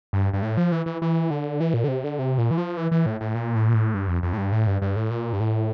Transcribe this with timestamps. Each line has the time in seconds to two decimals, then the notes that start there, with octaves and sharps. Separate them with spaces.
0.13 G2
0.33 G2
0.42 A2
0.57 F3
0.72 E3
0.86 E3
1.02 E3
1.31 D3
1.60 E3
1.74 A#2
1.84 D3
1.88 C3
2.04 D3
2.19 C3
2.38 A#2
2.51 E3
2.58 F3
2.77 E3
2.91 E3
3.06 A2
3.21 A2
3.35 A#2
3.55 A2
3.69 A#2
3.74 A2
3.94 G2
4.08 F2
4.23 F2
4.33 A2
4.38 G2
4.52 A2
4.67 G2
4.82 G2
4.96 A2
5.11 A#2
5.33 G2
5.40 A2